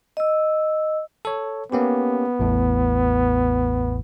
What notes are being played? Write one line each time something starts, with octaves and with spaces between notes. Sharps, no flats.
D#5 E6
A4 C#5
A#3 B3 C#4 G4
A1 E2 A2